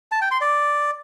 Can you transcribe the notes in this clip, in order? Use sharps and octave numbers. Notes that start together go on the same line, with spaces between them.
A5
G5
C6
D5